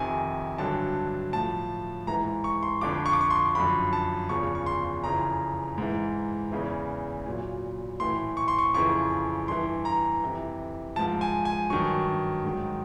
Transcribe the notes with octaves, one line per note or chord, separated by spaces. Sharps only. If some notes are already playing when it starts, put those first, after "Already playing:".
Already playing: F2 C3 D#3 G#5
G2 D3 F#3 A5
A2 F3 A5
G#2 E3 A#5
C#6
C6
F2 D3 F3 D6
C#6
D6
C#6
C6
F#2 D3 F3 B5
A5
E2 C#3 F3 C#6
C#6
C6
F2 C#3 E3 A#5
G#2 E3
E2 C#3 E3
A#2 F#3
A2 E3 C6
C#6
C6
C#6
F2 C#3 E3 C#6
G2 E3 C6
A#5
F2 C3 E3
G#2 F3 A5
G#5
G#5
G2 D#3 F#3 C#6
G#2 D#3 F#3